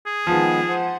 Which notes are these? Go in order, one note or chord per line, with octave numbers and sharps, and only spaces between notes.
G#4
D#3 F3 G#3 B3
C5 F#5